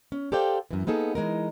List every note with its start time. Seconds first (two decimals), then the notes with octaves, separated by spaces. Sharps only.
0.12 C#4
0.32 G4 A4 C5 D5 F5 G5
0.71 F#2 E3
0.87 A#3 B3 D#4 G#4 A4
1.15 E3 G#3 D#4 A#4